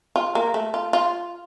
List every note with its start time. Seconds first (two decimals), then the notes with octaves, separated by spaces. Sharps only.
0.16 F4
0.35 A#3
0.54 A3
0.74 F4
0.93 F4